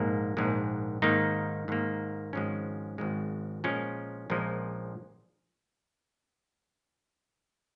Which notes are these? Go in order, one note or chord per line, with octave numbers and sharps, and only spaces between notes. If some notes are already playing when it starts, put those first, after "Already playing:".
Already playing: A#1 G#2 G#3 A#3
A#1 G#2 G#3
G#2 D#3 A#3 D#4
G#2 D#3 A#3
G#1 G#2 F3 G#3 C#4
G#1 G#2 F3 G#3
A#1 A#2 F3 G#3 C#4
A#1 A#2 F3 G#3